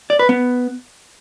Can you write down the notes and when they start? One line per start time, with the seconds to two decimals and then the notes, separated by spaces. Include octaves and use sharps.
0.10 D5
0.19 B4
0.29 B3